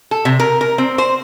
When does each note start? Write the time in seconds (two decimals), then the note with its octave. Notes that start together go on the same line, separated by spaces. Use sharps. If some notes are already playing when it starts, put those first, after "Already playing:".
0.11 A4
0.25 C3
0.40 A#4
0.61 A#4
0.78 C4
0.98 C5